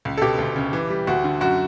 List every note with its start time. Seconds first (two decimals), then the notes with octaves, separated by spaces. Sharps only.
0.05 C#2
0.18 A4
0.21 B2 G4
0.39 D2
0.56 C#3
0.73 E3
0.90 G3
1.07 D2 F#4
1.24 D3
1.41 F#2 F#4